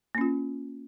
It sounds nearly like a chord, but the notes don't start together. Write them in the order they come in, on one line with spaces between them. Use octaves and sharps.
A#3 C#4 F4